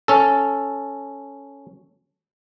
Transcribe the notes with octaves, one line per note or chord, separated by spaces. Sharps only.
C#4 A4